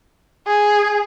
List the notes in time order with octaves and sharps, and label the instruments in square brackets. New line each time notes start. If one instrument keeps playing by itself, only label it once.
[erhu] G#4